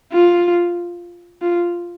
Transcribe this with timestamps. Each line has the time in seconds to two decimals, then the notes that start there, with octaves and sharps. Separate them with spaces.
0.12 F4
1.42 F4